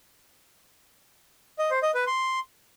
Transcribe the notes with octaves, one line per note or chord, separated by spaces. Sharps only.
D#5
C5
D#5
B4
C6